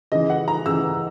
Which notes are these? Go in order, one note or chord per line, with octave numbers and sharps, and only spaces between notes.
C#3 E3 D#5
F#5
A#5
C#3 E3 E6